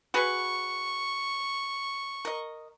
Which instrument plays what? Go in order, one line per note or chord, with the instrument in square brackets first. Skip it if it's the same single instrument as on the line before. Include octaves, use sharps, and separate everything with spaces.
[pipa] F#4 G#4 B4 [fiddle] C#6
[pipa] A#4 D#5